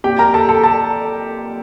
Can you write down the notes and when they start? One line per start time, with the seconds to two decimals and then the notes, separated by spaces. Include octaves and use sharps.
0.04 A#2 G4 G5
0.19 A#4 A#5
0.34 A4 A5
0.49 A4 A5
0.63 A4 A5